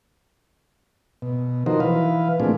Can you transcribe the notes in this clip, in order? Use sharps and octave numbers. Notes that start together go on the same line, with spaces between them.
B2
D#3 F3 D#4 F#4 A#4 C5
E3 B4 F5
A#2 F3 A3 C4 D4 G#4